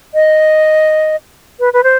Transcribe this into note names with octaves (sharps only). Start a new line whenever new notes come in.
D#5
B4
B4
C5